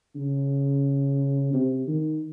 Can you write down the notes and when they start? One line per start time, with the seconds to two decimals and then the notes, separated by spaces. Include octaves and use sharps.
0.16 C#3
1.53 C3
1.87 D#3